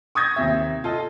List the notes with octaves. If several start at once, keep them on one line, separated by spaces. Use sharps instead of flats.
C#6 D#6 G6 G#6 A#6
D#2 C3 E5
F4 A4 D#5